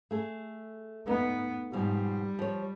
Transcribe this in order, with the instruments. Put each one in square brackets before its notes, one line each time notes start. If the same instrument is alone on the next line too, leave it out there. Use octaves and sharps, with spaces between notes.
[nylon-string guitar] A3 G#4 A4
[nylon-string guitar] A3 D#4 [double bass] B3
[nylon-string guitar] G#2 B2 F3 [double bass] G3
[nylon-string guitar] F3 C#5